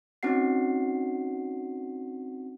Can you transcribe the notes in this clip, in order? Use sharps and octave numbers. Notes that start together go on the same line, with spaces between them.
C4 C#4 D#4 F#4 F#5 C7